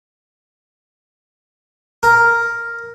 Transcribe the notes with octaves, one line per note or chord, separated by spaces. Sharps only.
A#4